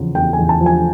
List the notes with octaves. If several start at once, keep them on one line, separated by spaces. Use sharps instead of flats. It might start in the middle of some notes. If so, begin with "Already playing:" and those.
Already playing: E2 C#3 F3
E2 G5
G#5
E2
A5
F3
G#5